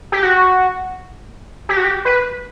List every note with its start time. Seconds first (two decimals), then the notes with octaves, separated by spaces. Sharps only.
0.12 G4
0.23 F#4
1.69 G4
1.77 F#4
1.84 G4
2.05 B4